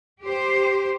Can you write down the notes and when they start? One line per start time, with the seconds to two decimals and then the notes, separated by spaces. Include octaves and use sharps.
0.21 G4 C5